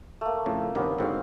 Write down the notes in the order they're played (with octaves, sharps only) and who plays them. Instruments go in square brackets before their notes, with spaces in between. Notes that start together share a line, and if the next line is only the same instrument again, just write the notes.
[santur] A3 A#3
[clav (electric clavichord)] F2 A2 C#3
[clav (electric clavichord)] G2 C3 D#3 [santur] A#3 B3 C#4
[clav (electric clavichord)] G#2 D3 [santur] C4 F#4 F5